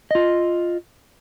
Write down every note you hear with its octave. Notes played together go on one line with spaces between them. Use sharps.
F4 D#5